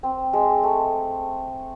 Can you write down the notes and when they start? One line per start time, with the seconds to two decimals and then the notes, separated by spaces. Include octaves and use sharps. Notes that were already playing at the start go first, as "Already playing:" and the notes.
0.03 C4
0.33 G#3
0.63 A3